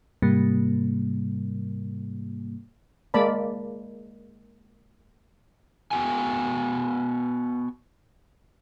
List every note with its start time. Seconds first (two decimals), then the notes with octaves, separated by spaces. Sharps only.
0.22 G#2 C3 G3 A#3
3.14 G#3 A#3 D5 A5 B5
5.91 B3 F#4 G5 G#5